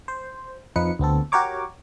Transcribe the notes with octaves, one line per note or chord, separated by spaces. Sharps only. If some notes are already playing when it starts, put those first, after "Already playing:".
C5
F2 F3 D#4 B4 C#7
D2 B3 C4 A4
F#4 G4 A#4 C#5 D6